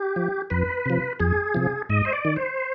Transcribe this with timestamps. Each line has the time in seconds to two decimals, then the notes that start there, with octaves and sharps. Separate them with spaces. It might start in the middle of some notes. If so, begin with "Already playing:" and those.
Already playing: G4
0.16 F3
0.50 F2 B4
0.86 C3 F3
1.20 F2 G#4
1.54 C3 F3
1.89 G#2 D#5
2.05 C5
2.13 D5
2.25 D#3
2.36 C5